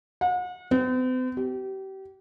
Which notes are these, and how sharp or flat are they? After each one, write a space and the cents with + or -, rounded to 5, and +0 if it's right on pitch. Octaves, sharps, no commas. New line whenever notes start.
F#5 -40
C4 -45
G4 -30